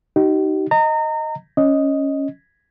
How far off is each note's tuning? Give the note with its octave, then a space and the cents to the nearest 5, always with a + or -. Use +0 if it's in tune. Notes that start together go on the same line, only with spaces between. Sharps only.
D#4 +0 G4 -40
D#5 +0 A#5 -30
C#4 +0 D#5 +0